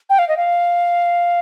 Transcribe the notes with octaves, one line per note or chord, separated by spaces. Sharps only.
G5
F5
D#5
F5